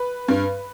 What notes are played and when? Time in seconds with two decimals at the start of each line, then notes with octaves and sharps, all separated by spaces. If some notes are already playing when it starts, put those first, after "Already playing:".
Already playing: B4
0.28 G2